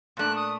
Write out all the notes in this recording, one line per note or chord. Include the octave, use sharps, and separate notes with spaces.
A#2 A3 D4 F#6
D#6